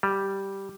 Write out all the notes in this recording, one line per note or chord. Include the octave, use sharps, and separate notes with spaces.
G3